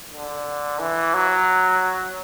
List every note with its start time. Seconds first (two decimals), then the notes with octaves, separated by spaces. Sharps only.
0.12 D3
0.79 E3
1.14 F#3